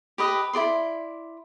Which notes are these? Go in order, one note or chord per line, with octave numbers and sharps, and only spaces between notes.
G4 B4 D#5
E4 A4 D5 C6